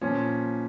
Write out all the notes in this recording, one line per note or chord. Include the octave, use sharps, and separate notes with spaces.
A#2 F3 C#4